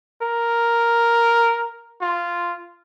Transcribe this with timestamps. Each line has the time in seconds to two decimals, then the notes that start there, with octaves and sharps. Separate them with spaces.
0.22 A#4
2.01 F4